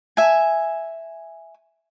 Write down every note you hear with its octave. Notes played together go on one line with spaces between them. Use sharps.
E5 G#5